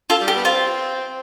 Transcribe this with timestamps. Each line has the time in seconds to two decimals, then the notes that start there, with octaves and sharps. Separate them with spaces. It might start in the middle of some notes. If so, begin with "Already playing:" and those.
0.10 F4 A4
0.21 G3
0.28 G4
0.36 B3
0.45 C4 F4